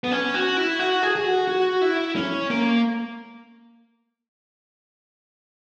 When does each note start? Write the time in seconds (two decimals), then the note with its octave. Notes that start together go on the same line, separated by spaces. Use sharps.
0.04 B3
0.12 C#4
0.34 F#4
0.57 E4
0.79 F#4
1.03 G#4
1.16 G#4
1.25 F#4
1.48 F#4
1.81 E4
2.16 C#4
2.50 A#3